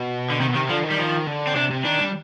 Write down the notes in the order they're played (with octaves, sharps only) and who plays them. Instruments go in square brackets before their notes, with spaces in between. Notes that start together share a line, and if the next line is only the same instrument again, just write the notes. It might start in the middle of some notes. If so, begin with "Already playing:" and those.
Already playing: [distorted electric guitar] B2
[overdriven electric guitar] D3
[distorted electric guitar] C3 [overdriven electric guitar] D#3
[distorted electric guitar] B2
[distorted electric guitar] C3 [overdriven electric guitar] D#3
[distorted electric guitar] D3 [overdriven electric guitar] F3
[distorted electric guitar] D#3
[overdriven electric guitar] G3
F3
[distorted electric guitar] D3
[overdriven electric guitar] C4
[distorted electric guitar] C3 [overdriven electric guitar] D4
[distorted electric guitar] C3
[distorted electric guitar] D#3 [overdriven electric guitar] D4
[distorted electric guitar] G3